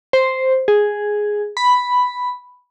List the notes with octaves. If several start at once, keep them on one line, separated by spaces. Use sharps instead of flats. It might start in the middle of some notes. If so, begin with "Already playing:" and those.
C5
G#4
B5